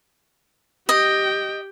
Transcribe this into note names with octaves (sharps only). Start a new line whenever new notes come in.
G4 D#5 G5